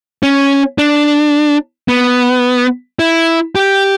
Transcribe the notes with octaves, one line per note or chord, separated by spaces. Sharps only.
C#4
D4
B3
E4
G4